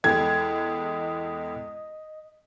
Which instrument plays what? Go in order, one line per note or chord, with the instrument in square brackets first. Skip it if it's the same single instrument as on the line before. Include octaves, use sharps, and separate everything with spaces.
[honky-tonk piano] E2 G#3 [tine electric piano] A4 G5 [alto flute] D#5 [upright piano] G#6